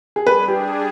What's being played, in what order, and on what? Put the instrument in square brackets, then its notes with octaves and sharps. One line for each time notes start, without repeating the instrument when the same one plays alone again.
[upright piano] G#4
[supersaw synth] G3 D4 G#4 [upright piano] B4
[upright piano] G4